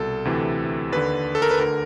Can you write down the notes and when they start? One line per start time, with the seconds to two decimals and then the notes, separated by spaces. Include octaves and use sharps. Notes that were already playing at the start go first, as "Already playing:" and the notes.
Already playing: C2 B2 A4
0.25 D2 C3 E3
0.92 D#2 D3 B4
1.35 A4
1.42 A#4
1.51 B4
1.59 D2 D3 A#4